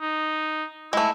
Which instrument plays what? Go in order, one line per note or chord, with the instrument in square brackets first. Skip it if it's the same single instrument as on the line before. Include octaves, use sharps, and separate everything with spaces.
[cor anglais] D#4
[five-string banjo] G#3 A3 [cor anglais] E4